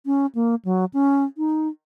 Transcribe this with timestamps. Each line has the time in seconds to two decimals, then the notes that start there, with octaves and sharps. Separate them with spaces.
0.06 C#4
0.35 A#3
0.65 F#3
0.94 C#4
1.38 D#4